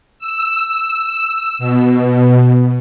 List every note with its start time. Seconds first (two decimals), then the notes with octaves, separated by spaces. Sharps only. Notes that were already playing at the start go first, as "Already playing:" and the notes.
0.19 E6
1.59 B2